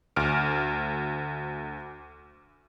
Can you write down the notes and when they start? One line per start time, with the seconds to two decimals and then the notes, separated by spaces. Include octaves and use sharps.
0.16 D2 F6 D7